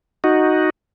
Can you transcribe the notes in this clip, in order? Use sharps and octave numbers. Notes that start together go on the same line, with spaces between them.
D#4 F#4